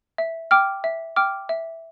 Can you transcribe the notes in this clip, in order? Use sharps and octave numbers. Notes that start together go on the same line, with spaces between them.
E5
G5 D6 F6
E5
G5 D6 F6
E5